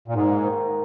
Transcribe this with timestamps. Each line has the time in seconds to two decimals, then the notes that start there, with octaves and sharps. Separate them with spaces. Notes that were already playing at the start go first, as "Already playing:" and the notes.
0.08 A#2
0.14 G#2 A#3
0.43 D#3